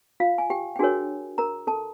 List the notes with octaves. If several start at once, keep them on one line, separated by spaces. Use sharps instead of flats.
F4 F5
G#5
G4 G5
G5
D4 F#4 G#4 A#4 C#5 G#5
A#4 A#5
A4 A5